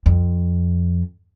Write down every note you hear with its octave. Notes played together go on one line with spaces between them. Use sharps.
F2